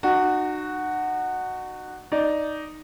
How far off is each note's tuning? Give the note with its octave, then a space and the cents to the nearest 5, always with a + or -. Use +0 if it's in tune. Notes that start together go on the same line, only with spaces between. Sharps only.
D#4 -40 F#4 +0
D#4 +0 D5 +0